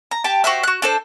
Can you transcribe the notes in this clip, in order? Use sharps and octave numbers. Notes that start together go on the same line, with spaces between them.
A#5
G4 G5 A5
F#4 G4 C5 E5
F#4 F#6
D4 A4 C5